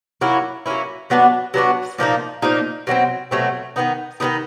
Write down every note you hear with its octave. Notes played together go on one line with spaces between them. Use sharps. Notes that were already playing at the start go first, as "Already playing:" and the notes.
F#3 A#3 C#4 E4
F#3 A#3 C#4 E4
F#3 B3 D4 F#4
F#3 B3 D4 F#4
A#2 F3 A#3 D#4
A#2 F3 A#3 D#4
B2 F#3 A3 C4
B2 F#3 A3 C4
D#3 F#3 B3 D#4
D#3 F#3 B3 D#4